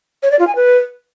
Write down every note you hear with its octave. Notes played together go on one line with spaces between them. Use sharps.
C#5
D5
F4
G#5
B4